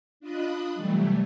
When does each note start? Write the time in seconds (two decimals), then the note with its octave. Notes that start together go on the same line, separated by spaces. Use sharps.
0.20 D4 F4 D#5 B5 D#6 F#6
0.74 C3 E3 F#3 G3 A3